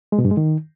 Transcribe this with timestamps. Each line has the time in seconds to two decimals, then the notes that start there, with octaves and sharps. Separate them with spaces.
0.12 G#3
0.19 B2
0.25 G2
0.31 G#3
0.37 D#3